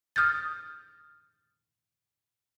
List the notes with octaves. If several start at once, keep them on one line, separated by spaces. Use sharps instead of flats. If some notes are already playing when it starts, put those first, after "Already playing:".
D#6 F6 G6 A6